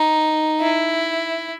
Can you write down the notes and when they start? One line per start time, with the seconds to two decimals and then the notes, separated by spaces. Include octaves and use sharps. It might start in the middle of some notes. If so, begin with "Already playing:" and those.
Already playing: D#4
0.61 E4